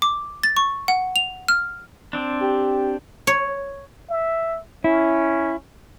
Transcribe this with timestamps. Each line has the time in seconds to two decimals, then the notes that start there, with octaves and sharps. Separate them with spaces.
0.02 D6
0.43 A6
0.57 C#6
0.88 F#5
1.16 F7
1.48 F6
2.13 C4 D4
2.42 G4
3.27 C#5
4.10 E5
4.84 C#4 E4